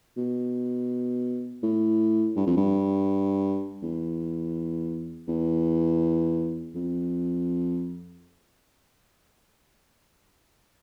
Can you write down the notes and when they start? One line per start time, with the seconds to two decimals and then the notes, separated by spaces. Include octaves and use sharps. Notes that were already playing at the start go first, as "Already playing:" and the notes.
0.17 B2
1.63 A2
2.36 G2
2.47 F2
2.57 G2
3.82 E2
5.28 E2
6.75 F2